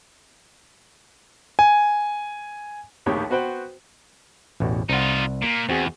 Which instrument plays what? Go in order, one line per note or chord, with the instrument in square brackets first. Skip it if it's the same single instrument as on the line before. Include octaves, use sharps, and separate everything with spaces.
[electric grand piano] G#5
[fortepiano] A#1 D#2 A2 D#3 G4 C#5
B3 F#4 B4 C5 G5
[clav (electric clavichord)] A1 E2 B2
[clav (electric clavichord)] C2 F#5 [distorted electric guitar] D#4 F4
[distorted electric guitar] A#2
[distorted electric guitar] E2 [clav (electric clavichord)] C4 F#4 G#4